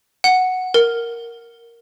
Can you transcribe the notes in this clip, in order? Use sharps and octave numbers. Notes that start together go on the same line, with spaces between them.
F#5
A#4